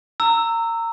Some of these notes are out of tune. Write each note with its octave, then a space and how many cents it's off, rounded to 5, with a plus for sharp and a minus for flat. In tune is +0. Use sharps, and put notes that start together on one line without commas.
A#5 -25 E6 +0